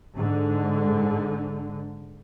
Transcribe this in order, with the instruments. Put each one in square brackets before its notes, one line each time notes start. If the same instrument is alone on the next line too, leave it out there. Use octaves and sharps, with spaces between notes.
[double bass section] G#2 D3